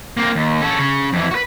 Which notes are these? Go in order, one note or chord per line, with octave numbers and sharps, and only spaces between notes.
A#3 C4
D#2
C#4 A4
C#3 C#4
F2 E3
F#4 B4